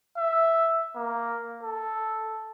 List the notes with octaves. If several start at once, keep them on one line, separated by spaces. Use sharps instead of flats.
E5
A#3
A4